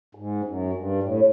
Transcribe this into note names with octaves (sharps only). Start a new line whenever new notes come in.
G#2
F#2
G2
A2